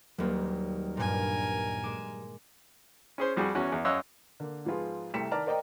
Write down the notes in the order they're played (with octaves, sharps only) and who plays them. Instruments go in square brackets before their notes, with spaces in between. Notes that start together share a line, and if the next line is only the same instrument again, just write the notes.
[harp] D#1 D#2 [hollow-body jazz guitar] F#3 G3 A#3
[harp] G2 A#2 [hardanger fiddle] A#4 G#5
[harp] G#3 D6 E7
[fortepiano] C#4 G#4 C5
F2 G3 F#4 G#4
E2 C#4 F#4 F#5
E2
F#2 C#5 D#5 F5 E6 F#6
[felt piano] D3 A#3
G#2 F3 B3 F4 G#4
C2 C3 A3 B6 C#7 E7
D#3 D5 A5 A#5 F6
A#4 C5 D5 D#5 G5 A#5